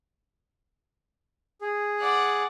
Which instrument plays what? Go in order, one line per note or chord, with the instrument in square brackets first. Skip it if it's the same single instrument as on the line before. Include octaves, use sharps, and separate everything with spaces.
[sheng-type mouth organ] G#4
[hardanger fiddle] D5 F#5